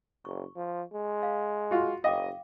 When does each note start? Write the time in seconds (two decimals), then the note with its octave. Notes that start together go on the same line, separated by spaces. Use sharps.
0.25 F#1 C#6
0.56 F3
0.93 G#3
1.23 F5
1.71 F4 F#4
2.04 F#1 D#5 F5 G5 D6